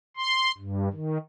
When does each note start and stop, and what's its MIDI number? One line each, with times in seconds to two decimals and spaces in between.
0.17 0.52 84
0.58 0.89 43
0.93 1.17 51